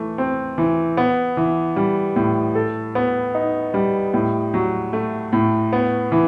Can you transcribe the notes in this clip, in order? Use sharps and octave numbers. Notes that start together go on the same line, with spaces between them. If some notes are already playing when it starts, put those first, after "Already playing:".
Already playing: E3 A3
C4
E3
B3
E3
G3
A2
A4
B3
D#4
G3
A2
F#3
A3
A2
B3
E3